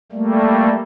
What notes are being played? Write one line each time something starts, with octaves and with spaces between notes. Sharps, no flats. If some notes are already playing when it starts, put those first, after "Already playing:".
G3 A3 A#3